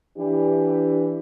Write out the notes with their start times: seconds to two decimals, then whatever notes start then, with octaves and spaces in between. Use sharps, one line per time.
0.18 E3 D4 G4